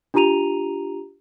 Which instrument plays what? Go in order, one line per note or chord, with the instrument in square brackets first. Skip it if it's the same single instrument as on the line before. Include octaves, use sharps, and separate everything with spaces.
[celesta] D4 F4 G4 A#5 D#7 F7